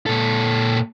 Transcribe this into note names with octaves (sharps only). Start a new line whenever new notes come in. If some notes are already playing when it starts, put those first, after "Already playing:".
A#2 A4